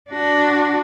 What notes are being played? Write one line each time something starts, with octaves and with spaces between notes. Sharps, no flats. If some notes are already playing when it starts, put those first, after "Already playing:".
D4 F#4